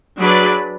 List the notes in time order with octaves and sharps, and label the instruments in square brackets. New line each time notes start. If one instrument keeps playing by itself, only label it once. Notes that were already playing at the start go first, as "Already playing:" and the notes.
[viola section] F#3 D4 G#4 B4 D5